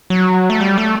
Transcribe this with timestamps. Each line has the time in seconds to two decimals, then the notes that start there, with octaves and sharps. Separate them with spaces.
0.10 F#3
0.50 A3
0.61 G3
0.78 A3